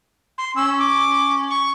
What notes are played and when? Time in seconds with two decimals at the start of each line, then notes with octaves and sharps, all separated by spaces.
0.38 C6
0.56 C#4 E6
0.79 D6
1.50 C#6